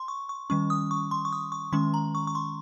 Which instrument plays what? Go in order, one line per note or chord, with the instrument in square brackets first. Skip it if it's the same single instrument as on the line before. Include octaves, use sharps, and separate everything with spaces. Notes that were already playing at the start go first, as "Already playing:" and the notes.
Already playing: [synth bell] C6
C#6
C#6
D#3 G3 C#4 C#6
D#6
C#6
C6
C#6
D#6
C#6
D#3 G#3 C#4 C6
A#5
C#6
C#6
C6